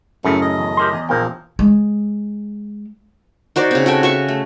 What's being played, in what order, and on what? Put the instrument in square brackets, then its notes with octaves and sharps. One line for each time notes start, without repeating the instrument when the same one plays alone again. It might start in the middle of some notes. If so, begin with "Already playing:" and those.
[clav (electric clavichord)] F#2 A2 C#3 [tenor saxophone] A3
[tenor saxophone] D#5
[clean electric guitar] E2
G4 A#4 C6
E2
[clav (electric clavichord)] A#1 A#3 G5 [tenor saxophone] F3
[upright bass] G#3
[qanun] D#4 F#4 C5 D5
C#3 C4
F#4 A4 G5 G#5
F#4 E5 C#6
A3